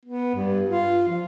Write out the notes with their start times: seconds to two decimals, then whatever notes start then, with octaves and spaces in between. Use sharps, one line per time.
0.05 B3
0.35 G2
0.69 F4
1.08 F3